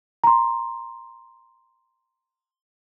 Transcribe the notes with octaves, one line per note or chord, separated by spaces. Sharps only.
A#5 C6